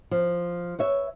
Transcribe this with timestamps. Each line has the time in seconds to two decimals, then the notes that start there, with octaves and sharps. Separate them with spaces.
0.11 F3
0.79 B4 C#5 E5